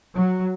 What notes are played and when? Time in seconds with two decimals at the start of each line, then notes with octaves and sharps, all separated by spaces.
0.14 F#3